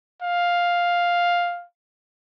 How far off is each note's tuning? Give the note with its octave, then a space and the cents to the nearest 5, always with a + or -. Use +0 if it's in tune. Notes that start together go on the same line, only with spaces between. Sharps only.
F5 +5